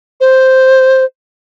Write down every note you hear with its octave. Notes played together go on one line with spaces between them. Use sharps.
C5